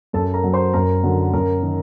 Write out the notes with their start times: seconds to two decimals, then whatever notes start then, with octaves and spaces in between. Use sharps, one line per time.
0.13 F#2 A4 A5
0.34 A#4 A#5
0.44 F#3
0.53 C5 C6
0.73 F#2 A#4 A#5
1.03 D3 F#3
1.33 F#2 A#4 A#5
1.63 D#3